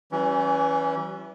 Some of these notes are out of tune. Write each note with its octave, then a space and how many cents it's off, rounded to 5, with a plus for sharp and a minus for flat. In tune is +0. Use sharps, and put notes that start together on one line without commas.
E3 +0 G3 -45 C#4 +0